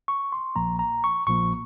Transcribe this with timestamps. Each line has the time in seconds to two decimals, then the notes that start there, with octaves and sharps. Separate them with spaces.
0.08 C#6
0.32 C6
0.55 A#1 A#2 F3 A#3 A#5
0.79 A#5
1.04 C#6
1.27 A#1 A#2 F3 A#3 C#6